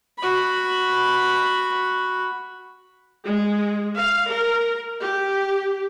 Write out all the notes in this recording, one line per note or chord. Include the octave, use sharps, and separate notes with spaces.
F#4 B5
G#3
F5
A#4
G4